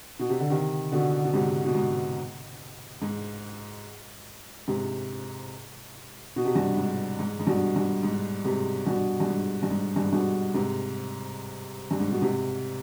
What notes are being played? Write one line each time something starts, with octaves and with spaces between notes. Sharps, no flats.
B2
C3
D3
C3 D#3
B2 D3
B2
G#2 C3
B2
G#2
G#2
G#2 C3
B2
C3
G2 B2
G#2
G#2
G#2
G2 B2
G2
G#2
G#2 C3
G2 B2
G2
G#2
G2
G#2
G2
G#2
G2 B2
G#2 C3
G2
G#2
B2
G#2 C3